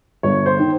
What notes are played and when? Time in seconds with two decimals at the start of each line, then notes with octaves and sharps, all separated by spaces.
0.23 G1 C#5
0.46 C5
0.60 D#3